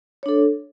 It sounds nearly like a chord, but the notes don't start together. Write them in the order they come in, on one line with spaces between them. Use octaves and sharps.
C#5 D4 A4